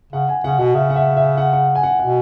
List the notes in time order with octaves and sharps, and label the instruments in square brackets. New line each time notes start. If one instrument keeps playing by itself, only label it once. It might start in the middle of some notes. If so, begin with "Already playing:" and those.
[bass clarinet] C#3 [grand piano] F#5
[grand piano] G#5
[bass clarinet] C#3 [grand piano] F#5
[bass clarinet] B2 [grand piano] F#5
[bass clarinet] C#3 [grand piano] E5
[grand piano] F#5
E5
E5
F#5
F#5
G#5
F#5
[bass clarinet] B2 [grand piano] F#5